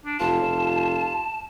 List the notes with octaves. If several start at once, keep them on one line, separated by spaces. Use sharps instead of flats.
D4
F1 F4 A5
F1